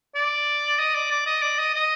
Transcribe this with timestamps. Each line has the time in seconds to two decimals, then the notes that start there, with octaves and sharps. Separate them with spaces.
0.15 D5
0.79 D#5
0.95 D5
1.11 D5
1.27 D#5
1.42 D5
1.59 D#5
1.74 D#5